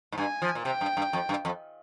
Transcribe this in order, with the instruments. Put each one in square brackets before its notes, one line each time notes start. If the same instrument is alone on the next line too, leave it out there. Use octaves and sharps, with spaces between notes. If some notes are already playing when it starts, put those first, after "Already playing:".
[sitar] G#2
[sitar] G2 [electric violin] G#5
[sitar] F3
A#2
[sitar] C3 [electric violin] G5
[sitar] G2
G2
F2
G2
F2